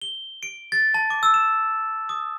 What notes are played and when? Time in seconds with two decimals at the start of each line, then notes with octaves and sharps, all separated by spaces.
0.02 G7
0.43 D7
0.72 A6
0.94 A5
1.10 D6
1.23 E6
1.34 E7
2.09 D#6